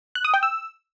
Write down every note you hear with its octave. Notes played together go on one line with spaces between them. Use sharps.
F#6
D#6
G5
E6